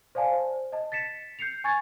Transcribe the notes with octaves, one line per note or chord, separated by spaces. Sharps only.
C5 D5 F5 G#5 A5
C5
D#5 A5
A6 B6 C#7 E7
G6 C7 C#7 F7
G#5 C#6 G#6 A6